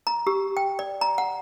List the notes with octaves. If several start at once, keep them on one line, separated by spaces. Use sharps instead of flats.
A#5
G4
G5
D5
A#5
F#5